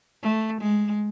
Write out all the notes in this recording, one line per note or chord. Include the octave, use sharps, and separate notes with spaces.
A3
G#3